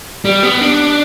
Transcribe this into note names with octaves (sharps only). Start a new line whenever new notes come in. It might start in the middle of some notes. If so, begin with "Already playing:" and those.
G3
B3
D4